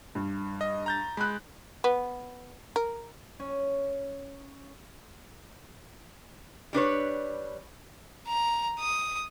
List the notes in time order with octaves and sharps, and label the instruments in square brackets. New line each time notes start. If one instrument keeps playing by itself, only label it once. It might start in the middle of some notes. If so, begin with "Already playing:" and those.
[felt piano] G2
[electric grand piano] D#5
A#5 G6 A6
[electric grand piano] G#3 [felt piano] B5 F#6
[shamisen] B3
A#4
[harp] C#4
[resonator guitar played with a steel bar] G3 D4 B4 C#5
[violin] A#5
D#6